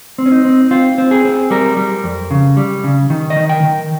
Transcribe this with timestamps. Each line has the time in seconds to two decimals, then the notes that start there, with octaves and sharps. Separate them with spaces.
0.18 C4
0.26 C#4
0.32 D#4
0.45 C4
0.71 C4 F4
0.98 C4
1.11 G#4
1.25 C4
1.50 G3 A#4
1.77 G3
2.04 F2
2.31 C#3
2.57 G3
2.84 C#3
3.10 D#3
3.30 D#5
3.36 D#3
3.49 G5
3.63 D#3